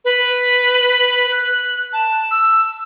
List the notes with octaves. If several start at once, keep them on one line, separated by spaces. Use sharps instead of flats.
B4
F#6
A5
E6